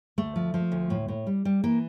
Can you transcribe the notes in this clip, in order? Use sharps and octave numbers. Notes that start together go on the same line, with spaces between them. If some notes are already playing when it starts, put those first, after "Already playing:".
D2 A3
F3
F3
D2
A2
A2
G3
G3
E3 A#3